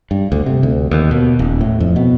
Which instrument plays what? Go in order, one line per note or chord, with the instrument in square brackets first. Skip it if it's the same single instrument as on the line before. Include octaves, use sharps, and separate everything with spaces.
[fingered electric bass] G2
D2
C3
D2
D#2
B2
D#1
A2
F2
B2